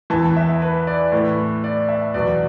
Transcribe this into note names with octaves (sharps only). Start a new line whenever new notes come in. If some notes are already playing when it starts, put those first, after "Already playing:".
E2 E3 A5
E5
B4
D5
A2 E3 B4
D5
E5
E2 B2 F#3 D5